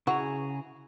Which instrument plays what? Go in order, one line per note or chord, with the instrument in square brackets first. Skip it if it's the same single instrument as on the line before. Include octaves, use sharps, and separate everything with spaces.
[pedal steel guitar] C#3 G#4 A#5 [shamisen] E4 F#4